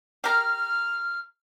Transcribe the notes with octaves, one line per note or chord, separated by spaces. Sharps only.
G4 A#4 F6